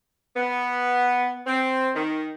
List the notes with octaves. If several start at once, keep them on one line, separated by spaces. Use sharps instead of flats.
B3
C4
D#3